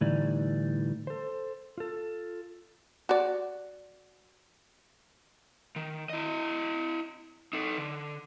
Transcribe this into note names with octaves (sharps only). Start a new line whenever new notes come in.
A2 D3 E3 G3 D#4 D5
A4 C5
F4 A4
F#4 D5
D#3
E4 D#5
D#4 A4
D3